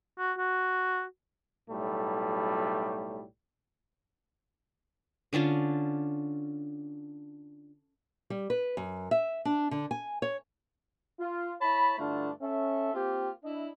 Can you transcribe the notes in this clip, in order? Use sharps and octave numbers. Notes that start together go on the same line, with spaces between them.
F#4
F#4
B1 A2 F#3 G3 A3
D3 C#4 D4 F4
G3
B4
F#2
E5
D4
D3
G#5
C#5
F4
E4 C#5 A5 B5
G2 D3 A3 D4 E4 F4
C#4 A4 E5
A#3 C4 F4 G4
D4 E4 D#5